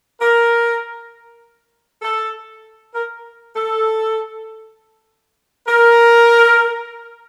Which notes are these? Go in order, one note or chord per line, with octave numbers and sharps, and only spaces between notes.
A#4
A4
A#4
A4
A#4